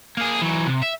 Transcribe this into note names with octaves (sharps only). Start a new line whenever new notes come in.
A#3 G#4
E3 F#3
C3
E5